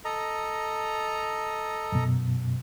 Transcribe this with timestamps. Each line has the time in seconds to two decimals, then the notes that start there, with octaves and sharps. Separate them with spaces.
0.05 A4 D#5 A#5
1.92 F#2 B2